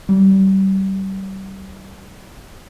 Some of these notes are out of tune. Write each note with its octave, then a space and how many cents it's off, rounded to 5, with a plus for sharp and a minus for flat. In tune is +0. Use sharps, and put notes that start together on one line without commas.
G3 -30